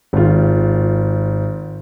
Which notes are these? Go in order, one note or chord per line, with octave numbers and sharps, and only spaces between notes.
G#1 F4